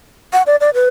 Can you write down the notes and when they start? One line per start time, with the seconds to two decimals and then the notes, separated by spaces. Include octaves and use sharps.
0.33 F#5
0.47 D5
0.61 D5
0.74 B4